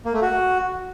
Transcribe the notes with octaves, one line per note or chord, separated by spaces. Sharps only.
A#3
A3
F#4